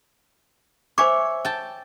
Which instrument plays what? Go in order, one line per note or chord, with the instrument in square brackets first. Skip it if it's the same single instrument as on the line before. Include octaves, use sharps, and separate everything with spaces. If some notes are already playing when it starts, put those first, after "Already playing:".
[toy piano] C5 G#5 D6 [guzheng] C#5 E5
[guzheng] G5 A5